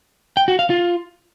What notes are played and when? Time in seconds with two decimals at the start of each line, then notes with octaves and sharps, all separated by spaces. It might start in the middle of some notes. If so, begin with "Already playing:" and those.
0.37 G5
0.48 F#4
0.59 F5
0.70 F4